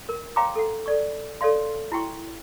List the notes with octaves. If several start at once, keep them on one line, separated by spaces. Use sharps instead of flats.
A#4
C#5 F5 G5 A#5 C6 D6
A4 F#5
A4 D5 C#6
A4 C#5 D5 F5 C6
E4 F#4 G5 C#6